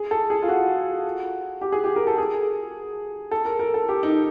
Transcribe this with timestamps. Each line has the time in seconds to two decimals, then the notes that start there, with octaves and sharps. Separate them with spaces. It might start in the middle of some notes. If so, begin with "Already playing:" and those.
Already playing: G#4
0.11 A4
0.30 G#4
0.42 F4
0.49 F#4
1.61 G4
1.72 G#4
1.84 G4
1.96 A#4
2.07 A4
2.18 G#4
3.31 A4
3.45 A#4
3.59 A#4
3.74 A4
3.89 G4
4.03 D#4